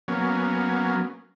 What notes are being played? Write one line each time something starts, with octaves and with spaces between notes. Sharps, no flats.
F#3 A#3 B3 C#4